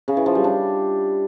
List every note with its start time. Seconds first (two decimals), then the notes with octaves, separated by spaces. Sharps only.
0.08 C#3
0.17 E3
0.26 F3
0.35 G3
0.44 D4